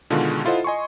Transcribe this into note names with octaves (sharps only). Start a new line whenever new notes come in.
B2 D3 D#3 G#3 F4 F#4
E4 F4 A4 C5 D#5 F#5
D#5 G#5 C6 C#6